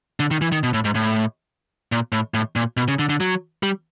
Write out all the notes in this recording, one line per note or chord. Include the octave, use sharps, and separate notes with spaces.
D3
D#3
E3
D#3
B2
A2
G#2
A2
A#2
A2
A2
A#2
B2
C#3
D3
D3
F#3
G3